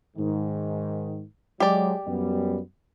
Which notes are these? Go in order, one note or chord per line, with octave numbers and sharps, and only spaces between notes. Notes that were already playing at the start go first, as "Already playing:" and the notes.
G#2 D#3
F#3 G#3 G4 D5
F#2 G3 B3